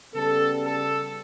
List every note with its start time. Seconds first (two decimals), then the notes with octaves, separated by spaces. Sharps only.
0.13 C#3 G3 B3 A4
0.63 A4